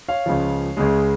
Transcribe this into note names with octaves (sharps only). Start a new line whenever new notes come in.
C#5 F5
C#2 C#3 F3
C#2 C#3 G#3